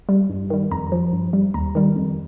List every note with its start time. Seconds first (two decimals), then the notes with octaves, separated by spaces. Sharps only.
0.09 G3
0.29 G2
0.50 D#3 G3
0.71 F2 A#5
0.92 F3
1.13 G2
1.33 G3
1.54 D#2 A#5
1.75 D#3 G3
1.96 F2